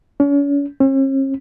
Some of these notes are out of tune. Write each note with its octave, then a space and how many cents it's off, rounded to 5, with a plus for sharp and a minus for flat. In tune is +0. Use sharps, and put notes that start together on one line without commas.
C#4 +40
C#4 -45